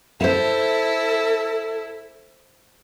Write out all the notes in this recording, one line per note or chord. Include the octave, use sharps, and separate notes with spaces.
E4 A4 C5 E5